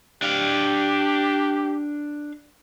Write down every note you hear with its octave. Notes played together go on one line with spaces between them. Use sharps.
D4 G4 F5